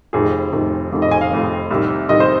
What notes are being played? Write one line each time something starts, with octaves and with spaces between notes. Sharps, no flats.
F1 F2 C3 D#3 G#4
F1 F2 C3 D#3
F1 F2 C3 D#3
D#5
G#5
F5
F1 F2 C3 D#3
C2 C3 D#3
C2 C3 D#3 D#5
C5